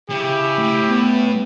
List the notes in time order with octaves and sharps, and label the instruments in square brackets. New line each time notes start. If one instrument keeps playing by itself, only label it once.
[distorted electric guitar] C#3 [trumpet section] E4 G4
[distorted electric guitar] A2
[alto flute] B3